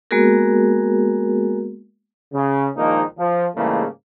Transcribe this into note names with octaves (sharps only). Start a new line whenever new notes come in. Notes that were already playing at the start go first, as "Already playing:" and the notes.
G#3 A#3 B3 F#4 G#4 A#4
C#3
A#1 D#3 F3 G#3 A#3 D#4
F3
G#2 C#3 E3 G3 A3 A#3